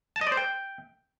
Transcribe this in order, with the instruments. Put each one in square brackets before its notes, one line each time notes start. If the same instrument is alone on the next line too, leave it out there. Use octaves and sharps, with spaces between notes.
[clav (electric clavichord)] A5
D#5
D5
C5
G5